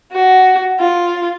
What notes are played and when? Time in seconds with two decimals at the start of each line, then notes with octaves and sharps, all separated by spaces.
0.12 F#4
0.80 F4